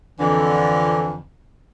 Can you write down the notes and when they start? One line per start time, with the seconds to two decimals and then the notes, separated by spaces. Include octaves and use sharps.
0.19 F2 D3 E3